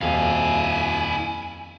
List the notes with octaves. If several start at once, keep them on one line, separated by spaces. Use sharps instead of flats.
D#1 F2 E4 F5 G#5